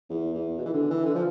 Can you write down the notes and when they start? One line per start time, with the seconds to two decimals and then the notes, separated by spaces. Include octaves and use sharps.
0.10 E2
0.34 E2
0.58 B2
0.65 E3
0.73 D3
0.90 E3
1.06 D3
1.15 F3